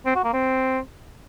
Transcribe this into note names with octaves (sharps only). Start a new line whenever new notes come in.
C4
F#4
A#3
C4